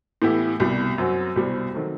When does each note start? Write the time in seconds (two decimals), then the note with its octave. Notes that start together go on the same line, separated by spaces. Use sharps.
0.22 A2 E3 B3 E4 G4
0.60 C2 B2 G3
0.98 F#2 F#3 C4 F#4
1.36 C2 B2 G3 C4
1.74 D#3 F#3 A3 C4